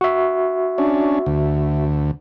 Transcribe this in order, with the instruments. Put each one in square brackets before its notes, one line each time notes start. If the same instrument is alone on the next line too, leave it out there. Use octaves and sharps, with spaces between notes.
[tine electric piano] F#4 E5
[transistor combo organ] C#4 D4
D2